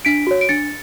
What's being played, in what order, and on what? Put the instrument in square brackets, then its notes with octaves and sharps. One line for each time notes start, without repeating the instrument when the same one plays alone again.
[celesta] D4 B6 D7
F#4 C#5
D7
D4 A6 C#7